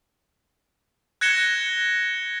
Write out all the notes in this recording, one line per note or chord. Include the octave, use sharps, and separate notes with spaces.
F#6 G#6 A#6 C#7 E7 G7